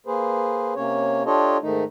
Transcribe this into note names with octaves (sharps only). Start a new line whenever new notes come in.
A#3 G#4 B4 C5
C3 A#3 C#4 C#5
D4 F4 G4 A4 C#5 D#5
G#2 D#3 A3 D#4